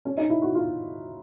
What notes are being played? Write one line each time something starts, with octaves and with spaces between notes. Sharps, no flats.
C#4
D#4
E4
F#4
F4